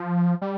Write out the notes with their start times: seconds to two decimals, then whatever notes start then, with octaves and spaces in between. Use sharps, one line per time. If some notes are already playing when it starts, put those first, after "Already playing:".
Already playing: F3
0.42 G3